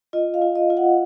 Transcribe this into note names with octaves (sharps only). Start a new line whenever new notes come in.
F4 D#5
F5
F4
D#5
F4
F#5